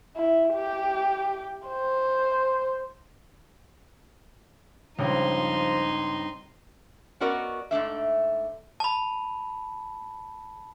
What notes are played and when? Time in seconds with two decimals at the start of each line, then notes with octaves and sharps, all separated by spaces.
0.16 E4
0.54 G4
1.67 C5
4.99 C#2 G2 F3 C4 D#4 C6
7.20 B3 C#4 F#4 A#4 D5 D#5
7.71 G#2 A3 D4 E5
8.80 A5 B5